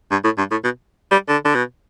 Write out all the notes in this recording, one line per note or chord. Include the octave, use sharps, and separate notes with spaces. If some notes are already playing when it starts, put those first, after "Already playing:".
G2
A2
G2
A2
B2
G3
D3
D3
B2